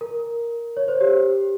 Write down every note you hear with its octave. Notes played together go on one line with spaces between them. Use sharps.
A#4
C#5
C5
G4